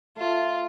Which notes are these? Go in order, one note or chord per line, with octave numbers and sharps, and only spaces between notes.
A3 F4